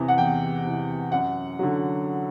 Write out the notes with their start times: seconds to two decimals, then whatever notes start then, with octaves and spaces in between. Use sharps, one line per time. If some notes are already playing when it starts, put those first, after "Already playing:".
Already playing: E2 C3 E3
0.08 F#5
0.18 E2 G5
0.65 C3 E3
1.12 F#2 F#5
1.59 D3 F#3